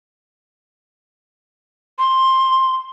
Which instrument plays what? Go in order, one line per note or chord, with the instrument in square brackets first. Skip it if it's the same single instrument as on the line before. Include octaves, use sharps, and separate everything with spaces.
[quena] C6